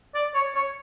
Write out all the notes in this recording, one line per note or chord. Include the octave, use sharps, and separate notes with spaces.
D5
C#5
C#5